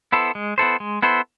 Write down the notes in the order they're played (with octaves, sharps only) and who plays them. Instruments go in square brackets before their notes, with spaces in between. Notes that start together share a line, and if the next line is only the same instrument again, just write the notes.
[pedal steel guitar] B3 E4 A4 C5
G#3
B3 E4 A4 C5
G#3
B3 E4 A4 C5